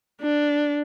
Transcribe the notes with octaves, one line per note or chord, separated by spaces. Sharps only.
D4